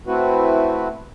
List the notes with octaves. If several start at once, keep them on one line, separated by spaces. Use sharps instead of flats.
A3 C4 E4 F#4 B4